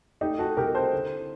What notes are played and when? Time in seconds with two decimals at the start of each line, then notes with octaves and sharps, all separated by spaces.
0.21 A3 D#4 G4
0.39 F#4 A4
0.57 C2 G4 A#4
0.74 A4 C5
0.93 D3